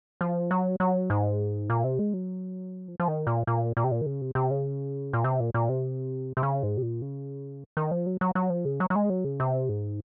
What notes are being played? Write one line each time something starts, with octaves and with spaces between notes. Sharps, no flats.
F3
F#3
F#3
G#2
A#2
C3
G#3
F#3
F3
F3
D#3
A#2
A#2
A#2
C3
A#2
D#3
C#3
C3
C3
C#3
A#2
C3
A#2
A#2
C3
C3
C#3
G#2
C3
A#2
C#3
D#3
F3
F#3
F#3
F#3
F3
C#3
F#3
F#3
G#3
F#3
C#3
C3
G#2